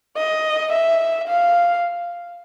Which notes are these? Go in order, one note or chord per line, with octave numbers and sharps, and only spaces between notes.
D#5
E5
F5